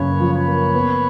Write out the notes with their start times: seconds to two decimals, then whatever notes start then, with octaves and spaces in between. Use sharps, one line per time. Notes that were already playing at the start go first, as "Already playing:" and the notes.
Already playing: F#2 C#3 A#3 B4 C#5
0.20 F3
0.34 B4 C#5
0.48 A#3
0.74 B3